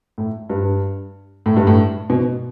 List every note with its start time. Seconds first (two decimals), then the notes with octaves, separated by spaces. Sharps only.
0.18 A2
0.50 G2
1.46 A2
1.57 G2
1.67 A2
2.10 B2